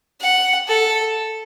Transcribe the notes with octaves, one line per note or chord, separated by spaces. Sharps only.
F#5
A4